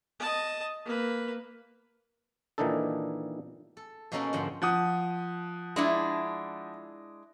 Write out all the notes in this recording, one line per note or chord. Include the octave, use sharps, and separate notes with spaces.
D#5 A5
A#3 B4
A#2 D#3 E3 D4 D#4 A4
A4
B2 A#3 C#4 D#4 A4 A#4
G#2 D3 F3 C4 F#5 C6
F3 F#5 D#6
G#3 D4 E4